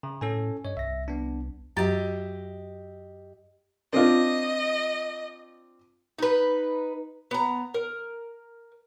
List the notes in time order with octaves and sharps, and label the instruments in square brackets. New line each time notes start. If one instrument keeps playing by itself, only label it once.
[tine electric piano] C#3
[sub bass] A2 [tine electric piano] C#4 A4 G#5
[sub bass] G2 [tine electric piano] C#5 D#5
[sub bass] C2 [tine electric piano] E5 A#6
[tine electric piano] B3 D4
[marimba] F#2 F#3 A6 [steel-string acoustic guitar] G4 D#5 E5
[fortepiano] C4 D4 F4 [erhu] D#5
[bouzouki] D#4 B4
B3 A#5
A#4